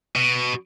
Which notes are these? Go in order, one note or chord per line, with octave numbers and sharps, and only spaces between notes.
B2